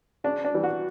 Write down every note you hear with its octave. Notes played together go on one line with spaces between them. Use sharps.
C#3 D4
D4
E3 G3
F#4